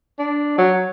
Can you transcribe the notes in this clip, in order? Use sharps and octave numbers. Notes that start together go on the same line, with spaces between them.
D4
F#3